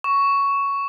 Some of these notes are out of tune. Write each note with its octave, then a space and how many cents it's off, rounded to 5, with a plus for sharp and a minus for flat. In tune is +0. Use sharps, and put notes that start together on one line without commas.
C#6 +10